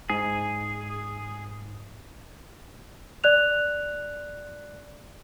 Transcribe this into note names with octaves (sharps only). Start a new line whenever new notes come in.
G#2 G#4
D5 F#6 F7